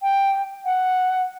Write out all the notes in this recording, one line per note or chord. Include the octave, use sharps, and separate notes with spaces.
G5
F#5